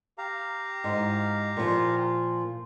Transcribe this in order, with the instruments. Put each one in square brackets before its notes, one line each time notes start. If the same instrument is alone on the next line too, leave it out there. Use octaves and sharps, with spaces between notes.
[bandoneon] G4 F5 A#5
[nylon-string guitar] G#2
A#2 F3